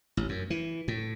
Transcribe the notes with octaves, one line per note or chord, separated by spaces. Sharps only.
A1
F#2
E3
A2